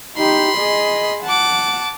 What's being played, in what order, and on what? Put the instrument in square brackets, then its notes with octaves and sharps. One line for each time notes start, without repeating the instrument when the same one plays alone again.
[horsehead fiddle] D#4 G4 [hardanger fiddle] B5 C6
[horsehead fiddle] G#4 D#5
[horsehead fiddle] F#5 [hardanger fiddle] A5 D6